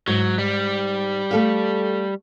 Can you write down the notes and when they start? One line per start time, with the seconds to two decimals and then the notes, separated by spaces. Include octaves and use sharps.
0.08 G#2 F#3
0.39 G3
1.31 A3 A4 F5